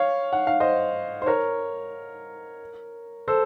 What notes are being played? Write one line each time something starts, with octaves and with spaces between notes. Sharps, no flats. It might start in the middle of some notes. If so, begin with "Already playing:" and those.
Already playing: C#5 F5
F#5
F5
C5 D#5
C5
A#4 C#5
A4 C5